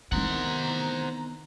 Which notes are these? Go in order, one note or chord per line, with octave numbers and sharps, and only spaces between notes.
C3 D#3 E3 B3 C4 C5 F#5 A#5